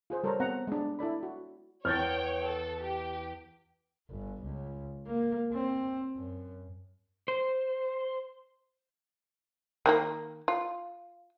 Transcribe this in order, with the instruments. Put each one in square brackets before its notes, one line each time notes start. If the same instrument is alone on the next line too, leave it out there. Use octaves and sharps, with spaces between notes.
[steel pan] F4 G#4 C5
G3 A4 A#4 C5 C#5 A#5
B3 C4 F#5 A#5
G#3 D4
E4 A4 D5 B5
F#4
[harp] E2 [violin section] C#5 G5 [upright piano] F6 G6 A6
[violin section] A4
G4
[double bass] G1
C#2
A#3
C4
F#2
[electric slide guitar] C5
[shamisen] D#3 F#3 A#3
F4